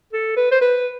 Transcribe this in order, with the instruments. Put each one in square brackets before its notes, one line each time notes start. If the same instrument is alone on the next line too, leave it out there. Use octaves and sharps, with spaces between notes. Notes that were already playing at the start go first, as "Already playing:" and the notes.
[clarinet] A4
B4
C5
B4